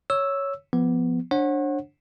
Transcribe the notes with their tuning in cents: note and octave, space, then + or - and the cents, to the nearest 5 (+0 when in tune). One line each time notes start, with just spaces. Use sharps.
C#5 +0 E6 +0
F3 +0 B3 +0
D4 +0 C#5 -45 F#5 -5